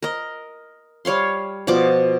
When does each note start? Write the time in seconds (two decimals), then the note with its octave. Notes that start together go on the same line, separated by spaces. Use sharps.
0.02 A#4 D#5
1.05 G3 C#5 F5 C6
1.67 B2 F3 D5 D6